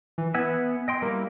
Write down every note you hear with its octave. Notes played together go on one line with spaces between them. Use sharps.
E3
B3 E5 F#5 G#5
D#5 G5 C6
G3 A#3 E4